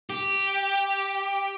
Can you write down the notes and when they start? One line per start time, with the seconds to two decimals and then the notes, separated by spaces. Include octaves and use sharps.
0.10 G4